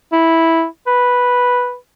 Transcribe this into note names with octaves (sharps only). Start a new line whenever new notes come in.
E4
B4